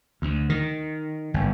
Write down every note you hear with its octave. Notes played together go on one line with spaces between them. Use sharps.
D2
D#3
G1